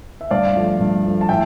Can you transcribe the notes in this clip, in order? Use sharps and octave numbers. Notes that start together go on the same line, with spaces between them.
E5
G2 D5 F5
F3 A3
G2
F3 A3
A5
A2 E5 G5